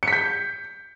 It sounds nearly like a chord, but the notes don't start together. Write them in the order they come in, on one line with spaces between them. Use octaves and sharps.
C#7 B6 G6